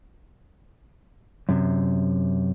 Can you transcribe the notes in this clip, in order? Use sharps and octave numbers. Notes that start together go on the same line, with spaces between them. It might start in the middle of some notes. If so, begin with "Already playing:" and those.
F#2 C3